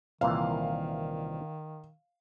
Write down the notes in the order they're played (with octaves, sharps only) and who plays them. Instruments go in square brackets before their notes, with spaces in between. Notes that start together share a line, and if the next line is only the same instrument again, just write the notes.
[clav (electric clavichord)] C2 A#2 E3 [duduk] D#3 [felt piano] F5